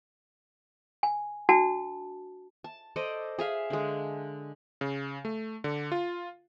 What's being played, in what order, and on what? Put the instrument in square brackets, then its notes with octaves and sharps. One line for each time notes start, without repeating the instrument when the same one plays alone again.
[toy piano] G#5
D4 F#4 A5
[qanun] A5
A4 C5 D5 D#5
G#4 E5 F5
D3 G#3
[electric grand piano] C#3
A3
D3
F4